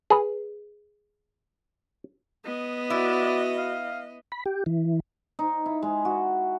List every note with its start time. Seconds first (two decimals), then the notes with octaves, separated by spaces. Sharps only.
0.10 G#4 B4
2.45 B3 D#5
2.90 E4 F#4 D5
3.58 F5
4.32 B5
4.46 G4
4.66 E3
5.39 D#4
5.66 E4
5.83 G#3
6.05 F#4